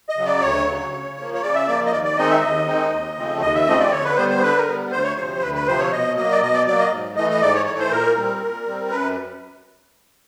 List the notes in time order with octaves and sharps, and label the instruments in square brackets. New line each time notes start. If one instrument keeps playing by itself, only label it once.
[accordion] D#5
C#3 F#3
D5
D2 C#5
C#3 F#3
C#3
F3 A#3
C#5
C#3 D5
E5
F3 A#3 D5
D#5
D#2 D5
D5
D#3 G#3 C4 D#4 D#5
E5
D#2 D#5
D#3 G#3 C4 D#4
D#2
C#3 F3 A3 C4
D#2 D#5
E5
C#3 F3 A3 C4 D#5
D5
D3 C#5
B4
G3 B3 C5
C5
D3 B4
A#4
G3 B3
D2 C5
C#5
C3 F3 C5
D2 B4
B4
C3 F3 C5
C#5
B2 D#5
F#3 A#3 D#5
D5
B2 D#5
D5
F#3 A#3 D5
D#5
G#2
E3 A3 D#5
D#5
G#2 D5
C#5
E3 A3 C#5
C5
A#2 A#4
G3 C4
A#2
G3 C4
F#2 B4